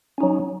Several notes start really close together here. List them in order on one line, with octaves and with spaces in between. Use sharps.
C#4 D#4 F#3